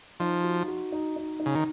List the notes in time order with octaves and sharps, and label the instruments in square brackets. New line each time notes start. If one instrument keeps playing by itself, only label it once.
[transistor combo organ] F3 [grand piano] D#4
[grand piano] F#4
F#4
D#4
D#4
D#4
[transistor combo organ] C#3
D#3